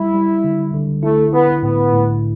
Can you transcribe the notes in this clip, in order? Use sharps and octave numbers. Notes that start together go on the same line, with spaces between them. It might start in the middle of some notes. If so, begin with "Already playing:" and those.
Already playing: G3 E4
G3
D3
D3
A3 E4
B3 E4
A2 B3
A2